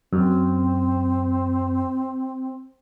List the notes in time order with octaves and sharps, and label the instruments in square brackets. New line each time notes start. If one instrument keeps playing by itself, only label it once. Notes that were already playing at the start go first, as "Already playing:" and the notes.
[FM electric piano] F#2 [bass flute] C4